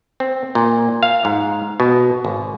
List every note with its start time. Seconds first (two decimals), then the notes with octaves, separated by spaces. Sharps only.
0.20 C4
0.55 A#2
1.03 F5
1.25 G#2
1.80 B2
2.25 G#1